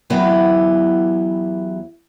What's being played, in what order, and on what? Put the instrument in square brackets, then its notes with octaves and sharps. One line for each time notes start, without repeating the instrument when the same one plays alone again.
[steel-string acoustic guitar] E2 F#3 B3 E4 G4